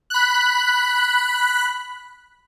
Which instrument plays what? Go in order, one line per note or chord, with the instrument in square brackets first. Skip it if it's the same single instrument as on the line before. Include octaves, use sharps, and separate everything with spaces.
[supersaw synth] B5 F#6